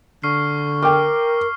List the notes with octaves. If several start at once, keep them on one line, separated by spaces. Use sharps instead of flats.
D3 C#6 F6 C7
A#4 G5 D6 F6